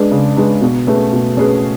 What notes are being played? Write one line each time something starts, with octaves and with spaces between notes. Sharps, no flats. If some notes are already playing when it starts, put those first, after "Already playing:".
Already playing: G#3 D4 G#4 B4
C#3
G#3 D4 G#4 B4
B2
A3 C#4 G#4 B4
B2
A3 C#4 G#4 B4